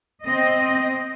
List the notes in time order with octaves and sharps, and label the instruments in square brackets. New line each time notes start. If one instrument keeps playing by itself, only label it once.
[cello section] C4 D#5